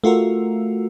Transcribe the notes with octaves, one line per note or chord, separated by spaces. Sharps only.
A3 F4 F#4 A#4